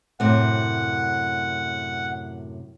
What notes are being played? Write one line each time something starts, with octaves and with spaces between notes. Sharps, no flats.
F#2 A2 C3 F#5